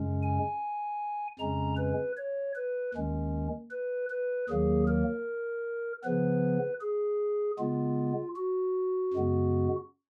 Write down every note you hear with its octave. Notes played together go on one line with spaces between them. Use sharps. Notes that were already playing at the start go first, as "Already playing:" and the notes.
Already playing: F#2 C#3 G#3 C#4
G#5
F2 C#3 G#3 C#4 A#5
B4
C#5
B4
D#2 D#3 G#3 C#4
B4
B4
D#2 D#3 F#3 A#3 G#4
A#4
C#3 F3 B3 B4
G#4
C#3 G#3 B3 F4
F#4
F#2 C#3 G#3 B3